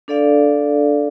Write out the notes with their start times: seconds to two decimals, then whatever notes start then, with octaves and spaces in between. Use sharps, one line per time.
0.08 D4 A4 D5 F5